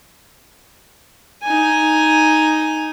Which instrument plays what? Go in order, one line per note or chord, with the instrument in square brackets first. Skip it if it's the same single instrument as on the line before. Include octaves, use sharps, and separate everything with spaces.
[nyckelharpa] D#4 G#5